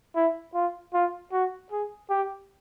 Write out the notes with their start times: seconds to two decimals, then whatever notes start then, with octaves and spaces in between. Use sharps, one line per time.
0.16 E4
0.54 F4
0.94 F4
1.32 F#4
1.72 G#4
2.10 G4